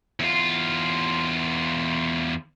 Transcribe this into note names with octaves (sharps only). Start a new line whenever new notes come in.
E2 F4